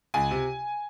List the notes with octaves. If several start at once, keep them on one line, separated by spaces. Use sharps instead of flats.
C#2 G#5
C3